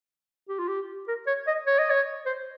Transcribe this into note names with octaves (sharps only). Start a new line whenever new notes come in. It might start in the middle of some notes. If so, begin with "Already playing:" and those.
G4
F4
G4
A#4
C#5
D#5
C#5
D#5
C#5
C5